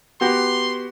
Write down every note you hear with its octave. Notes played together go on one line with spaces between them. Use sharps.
B3 F#4 G4 C6